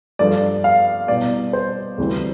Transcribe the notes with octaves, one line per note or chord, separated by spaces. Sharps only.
G2 F3 A3 D4 D5
F5
C2 B2 G3 D5
C5
D2 C3 E3 G3 C4